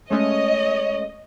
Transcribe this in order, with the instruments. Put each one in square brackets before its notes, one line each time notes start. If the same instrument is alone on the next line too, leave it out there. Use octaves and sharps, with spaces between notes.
[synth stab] G#3 A3 C#4 [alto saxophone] C#5 [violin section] D#5